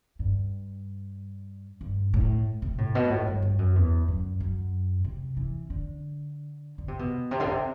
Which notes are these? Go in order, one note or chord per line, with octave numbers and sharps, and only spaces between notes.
G2
G2
A2
C3
A2
B2
A2
G2
G2
F#2
E2
F#2
F#2
C3
E3
D3
D3
C3
B2
C3
D3
C3